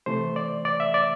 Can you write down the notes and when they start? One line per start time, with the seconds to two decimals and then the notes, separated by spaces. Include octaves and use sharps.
0.06 C3 E3 A3 C5
0.36 D5
0.65 D5
0.80 E5
0.94 D5